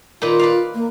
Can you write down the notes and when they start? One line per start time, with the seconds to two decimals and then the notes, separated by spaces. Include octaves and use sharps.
0.22 A#2 D#3 F4 B4
0.39 B4 D5 F5
0.74 A#3